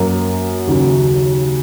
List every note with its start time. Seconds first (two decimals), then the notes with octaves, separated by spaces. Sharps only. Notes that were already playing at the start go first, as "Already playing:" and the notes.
Already playing: F#2 F#3 A#3 F#4
0.67 D#2 C#3 F#3